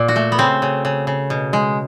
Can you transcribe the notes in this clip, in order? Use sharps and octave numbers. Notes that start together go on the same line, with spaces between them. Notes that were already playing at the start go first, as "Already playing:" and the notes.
Already playing: A#2
F#4
A3
B3
C#3 C4
C#3
C#3
C#3
B2
G#3